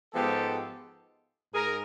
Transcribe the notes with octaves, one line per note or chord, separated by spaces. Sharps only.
G#2 F3 G#3 B3 G4 A4
G#2 G#4 A#4